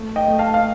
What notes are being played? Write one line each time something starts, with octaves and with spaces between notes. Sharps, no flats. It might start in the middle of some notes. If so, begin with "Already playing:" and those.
Already playing: A3
D#5 G5
A3
F5 A5
F5